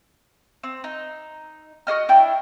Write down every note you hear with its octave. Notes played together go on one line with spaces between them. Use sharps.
C4
D#4
F#4 G#4 D#5 F6
D4 E4 G5